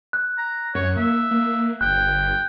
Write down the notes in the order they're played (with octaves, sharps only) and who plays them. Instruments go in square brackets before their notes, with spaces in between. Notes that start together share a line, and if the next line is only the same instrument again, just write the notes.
[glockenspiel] F#6
[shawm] A#5
[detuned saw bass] F#2 [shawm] C#5
[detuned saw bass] A#3 [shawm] E5
[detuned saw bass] A#3
[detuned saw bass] G1 [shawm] G5 [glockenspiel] F#6